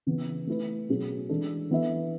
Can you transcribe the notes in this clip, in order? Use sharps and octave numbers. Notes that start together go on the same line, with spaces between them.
C#3 E3 B3
A3 E4 B4
B2 F#3 C#4 G#4
E3 G#3 D4 A4
E3 B3 E4 B4 E5